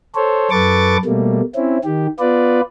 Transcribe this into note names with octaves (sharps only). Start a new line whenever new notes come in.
A4 C5 C#5
F#2 A4 B4 C#6 D6 A6
B2 G3 A3 A#3
C4 C#4 E4
D#3 G4
B3 F4 B4 D5